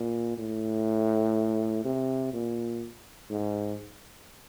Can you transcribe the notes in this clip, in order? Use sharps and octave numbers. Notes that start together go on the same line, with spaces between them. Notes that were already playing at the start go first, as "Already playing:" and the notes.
Already playing: A#2
A2
C3
A#2
G#2